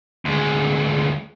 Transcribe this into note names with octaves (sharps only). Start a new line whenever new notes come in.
D2 G#3